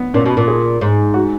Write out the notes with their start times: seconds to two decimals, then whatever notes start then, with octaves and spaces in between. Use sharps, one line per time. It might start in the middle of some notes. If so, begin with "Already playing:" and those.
Already playing: B3
0.14 A#2 C#4
0.26 B2
0.37 A#2
0.48 G#4
0.81 G#2
1.14 F#4